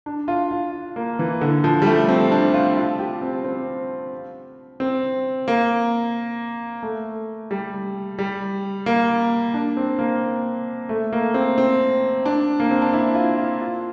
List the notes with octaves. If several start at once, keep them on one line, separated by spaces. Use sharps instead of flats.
D4
F4
F4
A#3
E3
D3
F3
G3
A3
C4
D4
F4
F4
G4
C4
C4
C4
A#3
A3
G3
G3
A#3
D4
C4
A#3
A3
A#3
C4
C4
D4
A#3
C4
D4
E4
F4
F4
F4